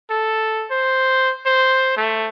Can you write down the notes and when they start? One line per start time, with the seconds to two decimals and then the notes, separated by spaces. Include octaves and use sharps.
0.10 A4
0.71 C5
1.46 C5
1.97 A3